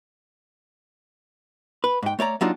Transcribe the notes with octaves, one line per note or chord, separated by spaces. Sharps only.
B4
G#2 G5
A3 C#5 D5 A#5
F#3 A#3 D4 D#4 F4 G4